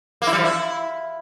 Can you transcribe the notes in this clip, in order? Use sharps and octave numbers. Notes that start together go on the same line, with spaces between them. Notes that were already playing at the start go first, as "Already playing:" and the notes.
A#3
E4
G3
F3
E4